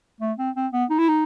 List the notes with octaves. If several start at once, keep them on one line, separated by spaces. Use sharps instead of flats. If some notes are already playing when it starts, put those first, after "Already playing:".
A3
C4
C4
B3
D#4
E4
D#4